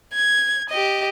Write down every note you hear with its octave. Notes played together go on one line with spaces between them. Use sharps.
G#6
G4 D#5